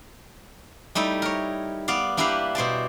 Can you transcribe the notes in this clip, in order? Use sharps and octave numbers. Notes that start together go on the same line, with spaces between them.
G3 A3 D#4 E4
A#4 C#5
B3 D5 F5
A#3 D4 E4 G4 B4 F5
B2 C5 D5 A5